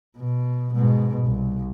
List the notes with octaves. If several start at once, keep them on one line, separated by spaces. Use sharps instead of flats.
B2
G#2 B2
C2